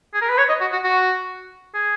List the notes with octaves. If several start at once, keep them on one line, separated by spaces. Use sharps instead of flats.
G#4
A#4
B4
C#5
D#5
F#4
F#4
F#4
G#4